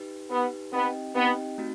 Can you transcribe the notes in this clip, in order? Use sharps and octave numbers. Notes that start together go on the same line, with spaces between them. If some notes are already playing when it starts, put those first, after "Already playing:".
Already playing: D#4 G4 B4
B3 D#4 G4 B4
B3 C4 D#4 G4 D#5 G5
B3 C4 D#4 G4 D#5 G5
A3 C4 D#4 F#4